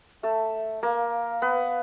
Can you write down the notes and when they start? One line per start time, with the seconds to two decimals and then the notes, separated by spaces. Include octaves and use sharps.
0.23 A3 A4 E5
0.83 A#3 A#4 F5
1.42 B3 B4